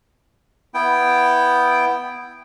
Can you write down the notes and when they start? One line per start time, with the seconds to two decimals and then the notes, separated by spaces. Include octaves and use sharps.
0.74 B3 E4 G5